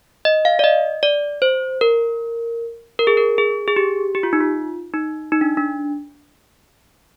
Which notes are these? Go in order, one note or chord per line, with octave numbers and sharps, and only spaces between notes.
D#5
F5
D5
D#5
D5
C5
A#4
A#4
G#4
A#4
G#4
G#4
G4
G4
F4
D#4
F4
D#4
D#4
D4
D4